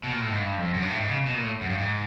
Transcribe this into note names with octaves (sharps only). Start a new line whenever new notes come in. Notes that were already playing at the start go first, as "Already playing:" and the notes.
B2
A#2
A2
G#2
G2
F2
F#2
G2
A2
G#2
C#3
B2
A#2
A2
F#2
G2
G#2